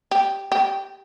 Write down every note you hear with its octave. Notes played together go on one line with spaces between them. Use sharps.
G4
G4